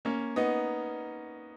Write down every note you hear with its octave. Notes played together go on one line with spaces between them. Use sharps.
A#3 C#4
B3 D#4